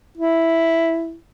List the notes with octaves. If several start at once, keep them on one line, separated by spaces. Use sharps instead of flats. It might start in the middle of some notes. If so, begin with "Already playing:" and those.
E4